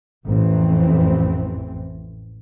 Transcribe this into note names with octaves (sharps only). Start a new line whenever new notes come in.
A1 F2 E3 C4